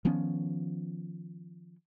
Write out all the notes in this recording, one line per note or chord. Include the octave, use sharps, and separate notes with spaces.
D#3 F3 B3 C#4